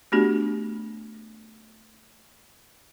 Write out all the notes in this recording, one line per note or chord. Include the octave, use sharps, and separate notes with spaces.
A3 B3 D4 F#4 G4